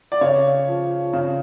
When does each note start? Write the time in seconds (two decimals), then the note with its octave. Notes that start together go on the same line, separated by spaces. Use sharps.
0.12 D5
0.21 C#3 C#5
0.68 F3
1.13 C#3